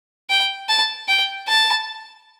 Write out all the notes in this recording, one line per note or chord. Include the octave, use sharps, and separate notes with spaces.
G5
A5
G5
A5